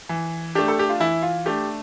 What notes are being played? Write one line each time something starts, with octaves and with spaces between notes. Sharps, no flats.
E3
A3 D4 G4
A4
G4
F4
E3 E4
F4
A3 D4 G4